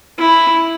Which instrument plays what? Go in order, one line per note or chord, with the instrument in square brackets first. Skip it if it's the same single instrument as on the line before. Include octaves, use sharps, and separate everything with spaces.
[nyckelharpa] E4